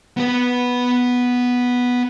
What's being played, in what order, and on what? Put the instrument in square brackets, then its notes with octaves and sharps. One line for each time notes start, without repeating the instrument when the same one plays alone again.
[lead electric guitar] B3 B4